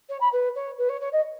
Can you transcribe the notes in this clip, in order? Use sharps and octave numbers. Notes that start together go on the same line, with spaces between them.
C#5
B5
B4
C#5
B4
C#5
C#5
D#5